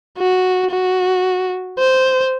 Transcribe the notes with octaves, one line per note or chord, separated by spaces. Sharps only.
F#4
F#4
C5